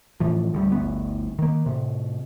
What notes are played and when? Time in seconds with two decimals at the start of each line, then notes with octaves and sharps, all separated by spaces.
0.20 A2 E3 F3
0.54 D2 G3
0.72 G1 D2 B3
1.39 D#3 A#3
1.66 A2 C3